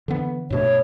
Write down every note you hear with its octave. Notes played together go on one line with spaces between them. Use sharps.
D3 E3 B3
G2 B2 A3 C#5